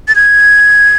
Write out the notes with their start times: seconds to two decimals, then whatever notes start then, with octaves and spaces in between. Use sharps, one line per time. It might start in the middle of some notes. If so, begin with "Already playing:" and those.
0.08 A6
0.15 G#6